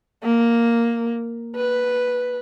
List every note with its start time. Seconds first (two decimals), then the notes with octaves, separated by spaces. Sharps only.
0.23 A#3
1.56 B4